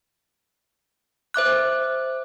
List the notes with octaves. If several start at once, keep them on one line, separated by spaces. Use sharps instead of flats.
C5 E5 D6 F#6